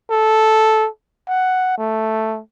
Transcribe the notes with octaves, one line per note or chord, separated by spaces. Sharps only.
A4
F#5
A3